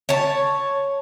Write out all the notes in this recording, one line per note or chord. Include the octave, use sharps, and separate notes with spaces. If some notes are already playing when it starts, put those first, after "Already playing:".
C#5 A5